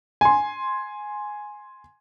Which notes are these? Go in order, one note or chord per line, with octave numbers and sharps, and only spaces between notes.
G#5 C6